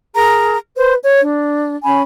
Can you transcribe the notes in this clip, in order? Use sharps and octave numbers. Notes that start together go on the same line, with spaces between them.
G#4 A#4 A#5
B4 C5
C#5
D4
C#4 G#5 B5